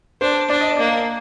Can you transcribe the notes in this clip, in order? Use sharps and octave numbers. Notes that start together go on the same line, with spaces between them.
D4 C5
D4 D5
D#5
D5
A#3